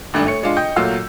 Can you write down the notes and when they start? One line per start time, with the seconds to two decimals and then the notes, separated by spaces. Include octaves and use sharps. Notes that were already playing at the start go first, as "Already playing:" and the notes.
0.14 G#1 G2 A3 D4
0.26 A3 C#5 C#7
0.43 G#3 D4 F4
0.57 D#5 G5 G6
0.76 A#2 F#3 A3 F4 F5 E6